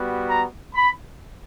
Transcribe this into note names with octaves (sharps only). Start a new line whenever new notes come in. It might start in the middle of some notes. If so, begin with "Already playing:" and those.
Already playing: G3 B3 F#4
A#5
B5